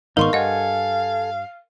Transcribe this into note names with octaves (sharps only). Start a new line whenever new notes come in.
G#1 G#2 B3 D#4 A#4 F5 C6 C#6
G2 A4 D#5 F#5 G#5